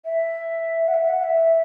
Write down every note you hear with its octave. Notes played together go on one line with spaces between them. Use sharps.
E5
F#5
E5
F#5
E5